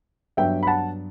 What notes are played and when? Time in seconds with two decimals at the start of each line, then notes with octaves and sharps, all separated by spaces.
0.37 G2 F#3 B3 D4 E5 G5
0.63 B5
0.67 F#5 A5